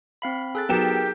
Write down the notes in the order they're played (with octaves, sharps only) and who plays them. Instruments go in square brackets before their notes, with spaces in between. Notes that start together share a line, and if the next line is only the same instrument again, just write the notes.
[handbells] C4 F5 B5
[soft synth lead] G#4 [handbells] A4 F#6 A6
[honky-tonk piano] F#3 G5 E7 [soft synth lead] B3 [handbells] D#4 G#4 A#4 [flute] G4